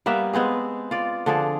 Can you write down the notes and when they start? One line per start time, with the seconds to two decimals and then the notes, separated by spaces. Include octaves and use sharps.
0.06 G3 A#3 B3 E5
0.33 G#3 B3 C4 G#4
0.91 F4 D5
1.26 D3 F3 G#4 D5